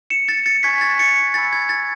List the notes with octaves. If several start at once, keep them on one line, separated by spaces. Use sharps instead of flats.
C#7 E7
A6 C#7
A6 C#7
G#5 C#6 F#6 G#6 B6
A6
A6 C#7
G#5 B5 E6 A6
G#6
A6